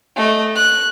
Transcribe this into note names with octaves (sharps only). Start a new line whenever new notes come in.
A3 D#5
F#6